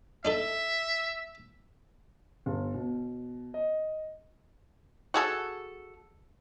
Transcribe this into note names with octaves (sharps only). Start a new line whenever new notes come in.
D4 D#4 A4 E5
G1
B2
D#5
F#4 G#4 A4